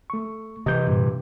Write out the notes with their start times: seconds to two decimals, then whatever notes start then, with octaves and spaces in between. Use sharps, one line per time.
0.10 A3 C#6
0.66 C3 E3 D#5 G6
0.87 G2 A#2